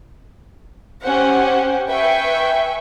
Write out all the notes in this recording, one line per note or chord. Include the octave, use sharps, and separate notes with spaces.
C#4 G4 C5 F#5
B4 E5 G5 G#5 C#6